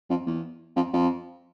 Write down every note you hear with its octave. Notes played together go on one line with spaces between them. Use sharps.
F2
E2
F2
F2